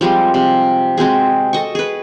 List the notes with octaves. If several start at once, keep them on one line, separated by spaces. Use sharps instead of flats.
F3 G3 G#3 C4
C3
G#3 C4 F#4 G#4
A4 D#5 C#6
G#4 B4